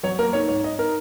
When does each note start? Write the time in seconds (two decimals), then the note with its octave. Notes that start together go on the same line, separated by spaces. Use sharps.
0.03 F#3 C#5
0.19 A#3 A#4
0.33 D#4 C#5
0.48 G#2 C#5
0.63 D#4 D#5
0.78 D#4 A#4